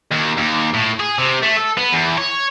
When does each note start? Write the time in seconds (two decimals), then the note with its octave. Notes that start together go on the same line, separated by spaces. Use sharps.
0.11 D#2
0.37 D#2
0.74 A2
1.00 G#4
1.18 C3
1.42 A3
1.56 A4
1.77 B3
1.92 E2
2.17 C#5